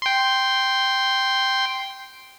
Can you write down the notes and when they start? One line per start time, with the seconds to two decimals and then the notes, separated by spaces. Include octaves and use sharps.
0.02 G5 C6